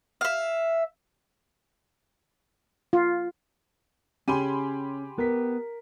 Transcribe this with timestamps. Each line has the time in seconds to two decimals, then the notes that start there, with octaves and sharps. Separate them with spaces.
0.21 E5 F5
2.93 F4
4.28 C#3 C#4 G4 G#5 B5 C6 D#7
5.18 B3 A#4 B6